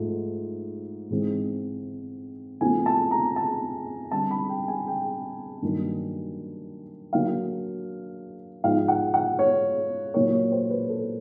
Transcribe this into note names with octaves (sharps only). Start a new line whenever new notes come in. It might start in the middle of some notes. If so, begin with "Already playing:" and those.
Already playing: G#2 F3 A3
G#2 E3 G#3 C4
E2 C#3 F3 A3 C4 G#5
A5
A#5
A5
D3 G3 C4 A5
B5
G5
G#5
G5
G2 D#3 F#3 A#3
D3 F#3 A#3 F5
G#2 F3 G#3 B3 D#4 F5
F#5
F#5
C#5
A#2 F#3 A#3 C#5
C#5
C5
B4
A4